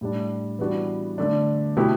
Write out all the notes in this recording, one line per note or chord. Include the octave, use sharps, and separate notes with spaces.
A2 G3 D4
E3 G3 B3 D4 F#4
D3 A3 D4
B2 A3 E4 G4